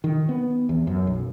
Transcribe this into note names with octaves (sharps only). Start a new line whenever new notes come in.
D#3
B3
E2
F#2
B1